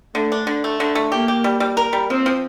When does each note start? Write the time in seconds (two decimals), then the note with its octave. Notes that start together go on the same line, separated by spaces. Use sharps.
0.14 D3 A3
0.32 D4
0.47 D3
0.64 A3
0.80 D3
0.95 A3
1.12 A#3 G4
1.28 G4
1.44 G3
1.60 G3
1.77 A#4
1.93 G3
2.10 F3 C4
2.26 F3